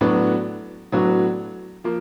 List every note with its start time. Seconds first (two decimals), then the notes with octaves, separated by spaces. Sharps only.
0.01 A2 F#3 B3 D4 F#4
0.92 A2 F#3 B3 D4 F#4
1.84 F3 A#3